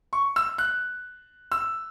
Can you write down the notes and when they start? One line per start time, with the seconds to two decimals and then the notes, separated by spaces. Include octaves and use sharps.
0.13 C#6
0.36 E6
0.58 F#6
1.52 E6